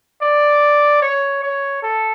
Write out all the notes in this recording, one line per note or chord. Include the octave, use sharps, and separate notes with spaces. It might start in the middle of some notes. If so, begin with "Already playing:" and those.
D5
C#5
C#5
A4